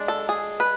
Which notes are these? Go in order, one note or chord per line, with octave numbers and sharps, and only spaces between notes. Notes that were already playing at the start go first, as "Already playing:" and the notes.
Already playing: G#3 D4
A4
G#4
B4